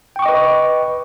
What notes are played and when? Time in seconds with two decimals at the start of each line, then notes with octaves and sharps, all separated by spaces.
0.16 G5
0.19 C#6
0.22 D6
0.26 D#5
0.29 B4